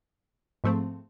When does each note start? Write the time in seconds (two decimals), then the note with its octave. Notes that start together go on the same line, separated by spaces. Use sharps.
0.64 G#2 F3 A3 C4